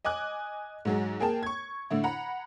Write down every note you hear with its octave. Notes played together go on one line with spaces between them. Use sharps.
D#5 G#5 D6 F#6
G#2 F#3 G#3
A#3 G#4 A#4 G5 A5
C#6 G#6
A2 D3 E4
F#5 A#5 B5